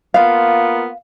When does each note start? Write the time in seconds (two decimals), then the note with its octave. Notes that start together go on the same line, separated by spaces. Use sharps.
0.14 A#3 B3 F4 F5